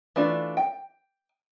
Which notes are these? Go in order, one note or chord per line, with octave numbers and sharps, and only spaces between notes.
E3 A3 D4 F4
G5